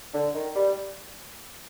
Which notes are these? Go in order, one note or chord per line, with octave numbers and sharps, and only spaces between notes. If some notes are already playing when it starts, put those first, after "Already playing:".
D3
D#3
G3